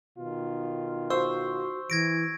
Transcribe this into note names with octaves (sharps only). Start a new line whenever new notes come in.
B2 D#3 F4
F#4 C5 C#6 E6
E3 G#6 A#6 D7